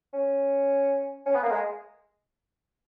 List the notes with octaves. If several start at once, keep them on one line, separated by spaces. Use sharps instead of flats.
C#4
C#4
B3
A#3
G#3